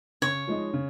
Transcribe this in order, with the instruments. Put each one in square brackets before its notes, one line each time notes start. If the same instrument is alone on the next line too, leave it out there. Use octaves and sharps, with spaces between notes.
[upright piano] C#3 [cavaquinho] C#5
[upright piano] F3 G#3 D#4
C#3